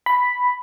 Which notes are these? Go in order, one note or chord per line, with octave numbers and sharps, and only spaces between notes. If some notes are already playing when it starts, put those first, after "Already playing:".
B5